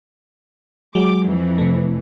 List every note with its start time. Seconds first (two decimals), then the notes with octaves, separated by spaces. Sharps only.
0.95 F#3 G#3 D6
1.24 F2 E3
1.58 C3 A3